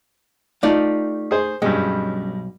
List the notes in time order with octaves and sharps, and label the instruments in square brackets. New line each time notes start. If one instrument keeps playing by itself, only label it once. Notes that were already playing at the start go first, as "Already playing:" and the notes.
[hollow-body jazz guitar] A3 D#4 F5 [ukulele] F4 G4 D5
[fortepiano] G#4 C5
[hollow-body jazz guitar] B1 [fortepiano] G2 G3 G#3 [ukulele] C#4 G5